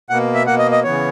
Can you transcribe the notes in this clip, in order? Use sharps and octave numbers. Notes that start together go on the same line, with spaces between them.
B2 A#3 F#5
E5
B2 A#3 F#5
D#5
D#5
C#3 E3 B3 C#5